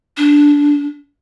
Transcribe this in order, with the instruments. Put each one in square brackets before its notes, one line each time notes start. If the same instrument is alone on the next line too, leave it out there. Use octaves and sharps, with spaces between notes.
[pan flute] D4